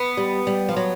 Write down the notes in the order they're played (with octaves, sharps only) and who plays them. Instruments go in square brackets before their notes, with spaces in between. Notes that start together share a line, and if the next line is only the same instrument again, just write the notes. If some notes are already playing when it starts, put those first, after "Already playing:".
Already playing: [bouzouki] B3
[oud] G3
G3
F3
F#3